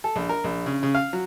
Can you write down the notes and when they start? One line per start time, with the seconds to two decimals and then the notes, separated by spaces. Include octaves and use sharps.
0.04 A4
0.16 A#1
0.29 A#4
0.44 A#1
0.66 C#3
0.83 C#3
0.95 F5
1.13 F#3